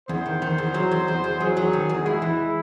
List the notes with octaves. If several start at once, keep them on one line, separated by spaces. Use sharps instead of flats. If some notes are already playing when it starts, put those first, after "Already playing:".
E2 C5
D#3
D#3
E2
F#3
E2
E2
E2
F#3 G#4
F#3
D#3
E2
G#3 E4
E3